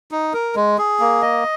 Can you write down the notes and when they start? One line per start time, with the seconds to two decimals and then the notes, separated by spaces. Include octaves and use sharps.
0.11 D#4
0.33 A#4
0.55 G#3
0.78 G#4
1.00 A#3
1.22 D#5